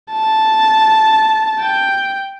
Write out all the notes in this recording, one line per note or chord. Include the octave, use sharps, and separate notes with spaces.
A5
G5